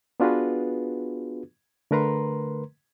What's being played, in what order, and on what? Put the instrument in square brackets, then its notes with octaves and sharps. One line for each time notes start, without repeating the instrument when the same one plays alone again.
[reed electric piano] B3 D4 F4 F#4 G#4 B4
D3 A3 A#4 B4 A#5 C6